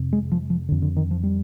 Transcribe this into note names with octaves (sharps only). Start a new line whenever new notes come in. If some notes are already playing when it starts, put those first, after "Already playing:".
Already playing: F2 C3
G#3
F3
F3
F2 D3
D3
D#3
F3
G3